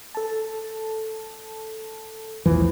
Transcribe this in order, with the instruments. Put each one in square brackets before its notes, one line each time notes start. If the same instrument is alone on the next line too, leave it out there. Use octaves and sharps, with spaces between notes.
[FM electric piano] A4 A5
[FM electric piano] B1 E2 A2 [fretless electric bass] E3 F3